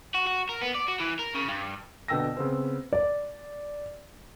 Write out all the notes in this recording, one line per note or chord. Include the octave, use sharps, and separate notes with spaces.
F#4
F#4
A#4
B3
D5
F#4
E3
A#4
C#3
G2
B2 D3 G5 E6 A#6
C#3 B3 C4
D5